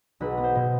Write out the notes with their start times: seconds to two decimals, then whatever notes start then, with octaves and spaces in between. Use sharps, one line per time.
0.20 B1 B4
0.38 B3
0.44 C5
0.55 B2